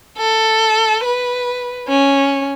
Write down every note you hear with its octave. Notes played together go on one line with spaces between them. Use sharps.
A4
B4
C#4